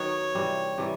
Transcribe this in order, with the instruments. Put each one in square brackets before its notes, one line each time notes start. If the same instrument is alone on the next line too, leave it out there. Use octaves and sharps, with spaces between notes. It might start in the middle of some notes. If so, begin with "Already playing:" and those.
Already playing: [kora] D#3 F#3 B3 [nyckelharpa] C#5
[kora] C3 E3 G3 C4
C3 E3 G3